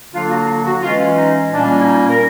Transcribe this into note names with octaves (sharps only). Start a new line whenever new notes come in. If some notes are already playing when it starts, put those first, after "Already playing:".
D3 F#3 A#3 D4 F4
F#4
F#4
E3 G#3 C#4 F4
D#4
A#2 G3 A#3 C#4 D4
E4
D#4
A#4